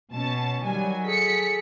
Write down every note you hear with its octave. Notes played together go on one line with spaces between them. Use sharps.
B2 C#4 A5
D#3 F#3 G3 G#5
G#4 A4 B6 C#7